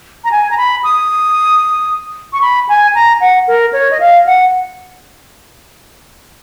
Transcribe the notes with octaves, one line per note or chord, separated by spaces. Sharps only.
A#5
G#5
A#5
B5
D#6
C#6
B5
G#5
A#5
F#5
A#4
C#5
D#5
F5
F#5